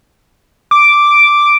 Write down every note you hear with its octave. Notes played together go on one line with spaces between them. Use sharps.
D6